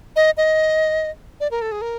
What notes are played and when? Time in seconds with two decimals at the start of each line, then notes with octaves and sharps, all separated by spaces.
0.16 D#5
0.37 D#5
1.40 D5
1.51 A#4
1.62 A4
1.72 G#4
1.82 A#4